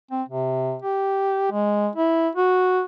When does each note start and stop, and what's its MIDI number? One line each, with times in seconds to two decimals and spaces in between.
0.11 0.23 60
0.29 0.77 48
0.82 1.51 67
1.52 1.89 56
1.96 2.29 64
2.35 2.83 66